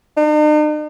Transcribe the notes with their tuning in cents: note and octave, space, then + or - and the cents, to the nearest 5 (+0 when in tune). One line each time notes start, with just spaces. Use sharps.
D#4 -45